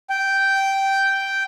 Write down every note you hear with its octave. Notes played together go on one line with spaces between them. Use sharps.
G5